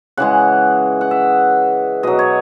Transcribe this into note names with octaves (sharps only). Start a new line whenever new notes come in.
C#3 E3 G#3 F#5
F#5
E5
B2 F#3 D#5
C#5